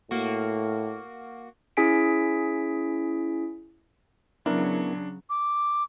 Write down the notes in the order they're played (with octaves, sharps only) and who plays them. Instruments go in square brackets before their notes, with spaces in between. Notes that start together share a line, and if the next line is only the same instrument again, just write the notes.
[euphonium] A2 [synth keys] A#3 F#4
[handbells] C#4 E4 G#4 G#5 B6 D7
[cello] C#3 F#3 [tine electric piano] B3 [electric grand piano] D4 [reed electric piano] E4 A#4
[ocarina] D6